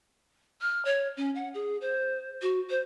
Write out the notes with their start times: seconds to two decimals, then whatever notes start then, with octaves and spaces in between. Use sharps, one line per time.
0.61 F6
0.85 C#5
1.17 C#4
1.35 F#5
1.54 G#4
1.81 C5
2.42 F#4
2.70 C5